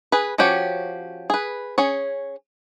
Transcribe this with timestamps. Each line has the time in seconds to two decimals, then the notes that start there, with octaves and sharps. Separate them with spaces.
0.12 G#4 B4
0.38 F3 C#4 F#4 G4 C#5
1.30 G#4 B4
1.78 C#4 G#4 C#5